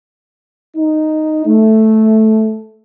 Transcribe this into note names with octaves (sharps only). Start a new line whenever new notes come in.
D#4
A3